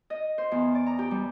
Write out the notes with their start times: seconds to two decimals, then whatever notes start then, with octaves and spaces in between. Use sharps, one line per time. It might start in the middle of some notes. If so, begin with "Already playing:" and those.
0.10 D#5
0.38 C5
0.52 E2
0.75 D5
0.86 A#5
0.99 G4
1.11 G3